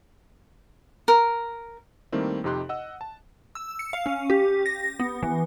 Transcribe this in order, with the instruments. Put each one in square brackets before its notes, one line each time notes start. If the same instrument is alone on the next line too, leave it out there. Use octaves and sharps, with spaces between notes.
[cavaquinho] A#4
[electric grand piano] D#3 G3 A3 A#3 C4 E4
F2 C3 D#4 G4 C6 F#6
D#5 F#5 E6
A5
[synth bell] E6
C#7
F5
C#4
G4
A#6
B3
E3